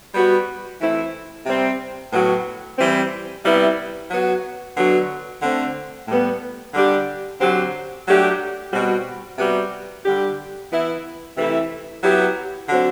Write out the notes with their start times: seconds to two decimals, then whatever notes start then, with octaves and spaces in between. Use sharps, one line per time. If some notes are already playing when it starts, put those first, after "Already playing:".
0.15 G3 B3 F#4
0.80 E3 A3 C4 E4
1.46 C3 G3 C4
2.13 A2 F#3 B3 F#4
2.78 E3 G3 C4
3.44 C3 G3 B3 E4
4.11 F#3 B3 F#4
4.77 D3 F#3 B3 D4 F#4
5.43 D3 A3 C4
6.08 A2 G3 B3
6.74 D3 G3 D4 G4
7.41 D3 F#3 C4 G4
8.07 F#3 A3 D4 G4
8.73 B2 G3 C4 F#4
9.38 C3 G3 B3 F#4
10.05 D3 G3 D4 G4
10.71 E3 B3 E4
11.36 C3 E3 A3 E4
12.03 F#3 B3 E4 G4
12.69 D3 F#3 C4